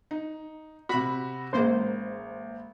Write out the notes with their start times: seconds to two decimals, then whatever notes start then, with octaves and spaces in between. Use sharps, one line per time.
0.11 D#4
0.89 C3 F#4 B5
1.53 A1 G#3 A#3 C5